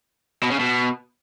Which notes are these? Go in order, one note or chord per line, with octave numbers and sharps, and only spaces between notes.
B2
C#3
B2